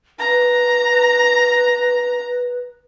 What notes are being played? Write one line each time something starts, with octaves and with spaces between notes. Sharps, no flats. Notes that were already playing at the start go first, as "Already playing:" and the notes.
B4 A#5